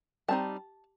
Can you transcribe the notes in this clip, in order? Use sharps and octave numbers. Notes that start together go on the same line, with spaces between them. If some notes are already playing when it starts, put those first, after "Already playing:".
G3 C4 D#4 A5